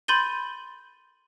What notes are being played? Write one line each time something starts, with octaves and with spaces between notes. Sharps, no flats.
B5 C6 G6 A6 D#7 G7